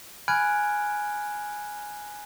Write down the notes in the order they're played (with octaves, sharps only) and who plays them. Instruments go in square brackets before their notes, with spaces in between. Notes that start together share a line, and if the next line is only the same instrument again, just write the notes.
[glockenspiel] G#5 B5 F6 F#6 G#6 D7